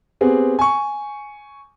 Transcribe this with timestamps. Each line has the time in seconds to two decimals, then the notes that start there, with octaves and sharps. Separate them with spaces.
0.21 B3 C4 G4 G#4
0.59 G#5 C#6